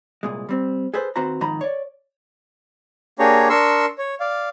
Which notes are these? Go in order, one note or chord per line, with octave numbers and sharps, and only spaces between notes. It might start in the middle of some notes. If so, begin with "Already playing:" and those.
C2 A#2 G#3
G3 C4
G#4 A4 B4 C5
D#2 C4 F#4 B4 C5 A#5
F2 G#2 D#3 A#5 B5
C#5 D5
A#3 D4 G4 G#4 C#5 A#5
D4 A#4 C6 C#6 E6
C#5
D5 F5